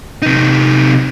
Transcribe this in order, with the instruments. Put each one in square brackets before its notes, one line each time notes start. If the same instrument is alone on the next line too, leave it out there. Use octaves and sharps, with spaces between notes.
[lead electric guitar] C3 D#4